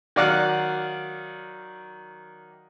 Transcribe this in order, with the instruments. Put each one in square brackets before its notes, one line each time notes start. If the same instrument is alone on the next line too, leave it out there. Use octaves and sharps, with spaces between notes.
[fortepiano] D#3 F#3 D5 F5 F#5 F#6